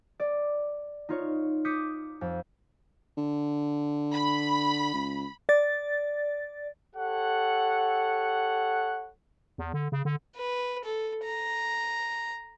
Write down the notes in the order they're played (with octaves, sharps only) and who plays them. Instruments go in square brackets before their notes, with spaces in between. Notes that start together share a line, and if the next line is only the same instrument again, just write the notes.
[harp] D5
D#4 F4 C#5
D6 D#6 G6 B6 C#7
F2
[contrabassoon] D3
[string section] B5
[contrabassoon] C#2
[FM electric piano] D5 A6
[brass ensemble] G4 A4 C#5 F#5
[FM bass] E2
D3
C#3
D3
[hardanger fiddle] B4
A4
A#5